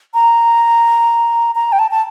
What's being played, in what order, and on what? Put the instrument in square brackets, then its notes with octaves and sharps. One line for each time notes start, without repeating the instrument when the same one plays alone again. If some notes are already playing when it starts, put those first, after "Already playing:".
[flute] A#5
A#5
G5
A5
A5